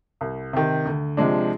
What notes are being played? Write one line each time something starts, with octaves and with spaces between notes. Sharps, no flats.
C2
C3 D#3
D2
C3 F3 G#3 D4